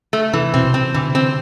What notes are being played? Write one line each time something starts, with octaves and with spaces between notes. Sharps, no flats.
A3
C3 E3
B2 C4
C3
C4
D3 E3
C4